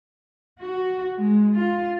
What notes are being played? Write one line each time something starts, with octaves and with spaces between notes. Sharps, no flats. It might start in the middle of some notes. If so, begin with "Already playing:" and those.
F#4
G#3
F4